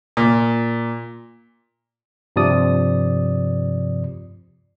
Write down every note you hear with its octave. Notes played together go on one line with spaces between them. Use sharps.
A#2
G2 C3 F3 D5 D#6